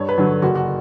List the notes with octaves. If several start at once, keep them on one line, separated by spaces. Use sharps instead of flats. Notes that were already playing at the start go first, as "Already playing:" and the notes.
Already playing: G2 C#5
B4
D3 F#3
F#1 F#4
F#4